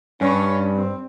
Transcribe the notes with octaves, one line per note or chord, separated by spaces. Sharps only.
G2 C#4
C4